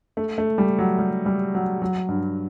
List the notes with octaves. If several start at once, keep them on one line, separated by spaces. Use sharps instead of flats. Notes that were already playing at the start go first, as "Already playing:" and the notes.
A3
A3
G3
F#3
G3
G3
F#3
F#3
G2